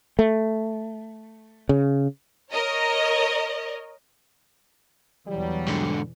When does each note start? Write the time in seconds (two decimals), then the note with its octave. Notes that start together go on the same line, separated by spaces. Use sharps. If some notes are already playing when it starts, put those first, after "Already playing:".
0.19 A3
1.69 C#3
2.52 A#4 C#5 D#5
5.28 E2 B2 E3 F#3 G3
5.68 G#2 D3